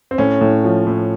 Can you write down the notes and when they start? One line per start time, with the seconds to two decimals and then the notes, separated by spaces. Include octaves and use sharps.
0.11 C4
0.18 A2 C#4
0.41 A2
0.64 F3
0.87 A2